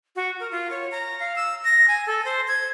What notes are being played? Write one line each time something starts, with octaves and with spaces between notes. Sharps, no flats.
F#4
A#4
F4
C#5
A#5
F5
E6
A#6
G#5
A4
C5
G#6